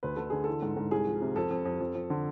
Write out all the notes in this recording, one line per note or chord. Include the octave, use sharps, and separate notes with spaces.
D2 B4
D3 A4
D3 G#4
E3 A4
G#2
G#2
C2 G#4
F3
C3
F2 A4
F2
F2
F2
F2
D3